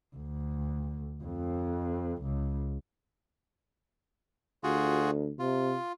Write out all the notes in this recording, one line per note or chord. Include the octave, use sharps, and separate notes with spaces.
D2
F2
C#2
D2 F4 F#4 G#4
C3 F4